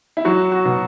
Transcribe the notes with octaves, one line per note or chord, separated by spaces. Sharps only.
E4
F#3 F#4
F#4
B2